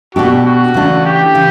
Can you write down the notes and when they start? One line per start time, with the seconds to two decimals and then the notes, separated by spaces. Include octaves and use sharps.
0.15 B2 A3 D4 F#4 G4
0.45 F#4
0.74 C#3 E3 A3 D4
1.05 G4
1.34 C#3 E3